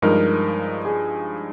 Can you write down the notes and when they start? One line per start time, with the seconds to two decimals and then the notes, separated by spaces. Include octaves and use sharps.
0.02 G2 F3 G#3 D#4 A#4
0.85 G#4